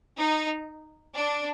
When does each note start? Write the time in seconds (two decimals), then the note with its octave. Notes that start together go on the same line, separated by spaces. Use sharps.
0.17 D#4
1.15 D4